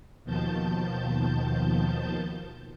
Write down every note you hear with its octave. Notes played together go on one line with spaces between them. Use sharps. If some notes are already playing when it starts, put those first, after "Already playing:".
D#2 B2 D#3 F3 A5 G6